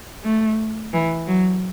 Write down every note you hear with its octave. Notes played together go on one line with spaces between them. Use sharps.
A3
E3
F#3